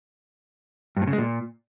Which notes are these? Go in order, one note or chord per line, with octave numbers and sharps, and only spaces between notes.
G2
A2
C#3
G#3
A#2